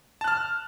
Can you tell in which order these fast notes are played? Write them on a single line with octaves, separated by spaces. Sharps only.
A5 F#6 F6